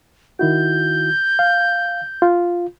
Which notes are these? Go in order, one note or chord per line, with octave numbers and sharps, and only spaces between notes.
D#3 E4 F#4 G6
F5
F4